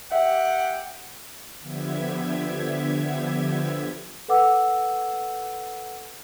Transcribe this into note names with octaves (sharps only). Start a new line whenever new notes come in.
G4 E5 F#5 G5
D3 F3 B3 G4 E5 G#6
A4 B4 F#5 D6 E6